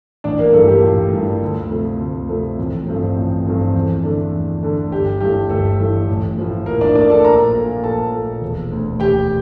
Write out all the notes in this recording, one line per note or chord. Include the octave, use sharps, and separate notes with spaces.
A1 D4 D5
A#3 A#4
G2 E3 G3 A3 A4
G4
A1 F4
G2 E3 G3
D2
C3 F3 A3
D2
C3 F3 A3
A1
G2 F3 A3 C4
A1
G2 F3 A3 C4
E2
D3 A3 D4
E2
D3 A3 D4
G1 G4
G2 E3 A3 G4
G1 A3 A4
G2 E3 A3
A1
A2 F3
A1 A#3 A#4
D4 D5
A2 F3 D4 D5
A4 A5
A#1 A#4 A#5
A#2 A3
A#1 A4 A5
A#2 A3
E1
D2 D3
E1 G4 G5